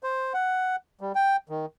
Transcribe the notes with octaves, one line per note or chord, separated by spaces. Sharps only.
C5
F#5
G3
G5
D#3